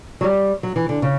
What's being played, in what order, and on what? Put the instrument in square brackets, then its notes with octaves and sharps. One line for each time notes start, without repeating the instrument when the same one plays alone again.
[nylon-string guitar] F#3
G3
F#3
E3
D3
C#3